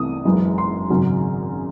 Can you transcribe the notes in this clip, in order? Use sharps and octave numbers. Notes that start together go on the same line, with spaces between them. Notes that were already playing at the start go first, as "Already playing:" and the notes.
Already playing: C2 C3 E3 A3 D#6
F#1 F#2 E3 G#3
C6
G#1 F#2 C#3 F#3